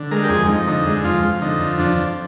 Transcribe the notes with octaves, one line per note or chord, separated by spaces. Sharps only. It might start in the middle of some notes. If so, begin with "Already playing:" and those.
Already playing: D3
G#3 A#4
G4
F2 G#4
F2 D#4
D3 D#4
G#3
F2 F4
F2
D3 D#4
F3
F2 D4
F2